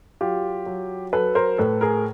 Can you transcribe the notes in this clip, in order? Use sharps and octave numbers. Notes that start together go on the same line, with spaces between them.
F#3 F4 G4
F#3
F#3 A4 B4
A#4 C5
A2 A4 B4
G#4 A#4